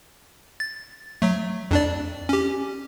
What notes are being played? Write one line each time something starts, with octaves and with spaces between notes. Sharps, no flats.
A6
F#3 A3
F2 D4 D5
C#4 G4